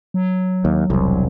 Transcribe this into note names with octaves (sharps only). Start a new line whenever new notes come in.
F#3
D#2
E1 C2